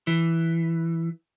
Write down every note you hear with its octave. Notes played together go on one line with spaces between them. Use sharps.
E3